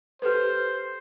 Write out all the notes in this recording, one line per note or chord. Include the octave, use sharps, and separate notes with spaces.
G4 A4 B4 C5